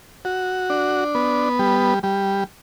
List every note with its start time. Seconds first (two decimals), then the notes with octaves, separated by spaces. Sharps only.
0.25 F#4
0.70 D4
1.15 B3
1.59 G3
2.03 G3